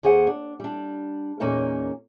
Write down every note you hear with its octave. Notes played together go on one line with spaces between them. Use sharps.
D#2 A#3 G#4 C5 F#5
D4
G3 D4
E2 A#2 A#3 C#4 D#4 A#4